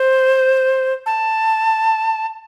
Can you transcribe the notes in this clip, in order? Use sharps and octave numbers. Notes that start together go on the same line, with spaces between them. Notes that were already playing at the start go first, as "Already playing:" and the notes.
Already playing: C5
A5